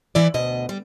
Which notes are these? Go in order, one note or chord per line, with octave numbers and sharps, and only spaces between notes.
E3 E4 D5
D2 B2 D#5
G3